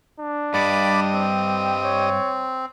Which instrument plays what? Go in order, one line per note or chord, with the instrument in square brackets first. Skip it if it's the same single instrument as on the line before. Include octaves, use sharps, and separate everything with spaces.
[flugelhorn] D4
[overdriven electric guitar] G2 [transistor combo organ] G3 D#5 [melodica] D5 B5 D6
[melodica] C4
[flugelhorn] C#5